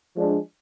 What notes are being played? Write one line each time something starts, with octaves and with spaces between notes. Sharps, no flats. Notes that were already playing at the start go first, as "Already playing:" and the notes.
F3 G#3 D4